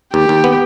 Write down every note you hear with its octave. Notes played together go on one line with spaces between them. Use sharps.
D#2 G4
D#2
B3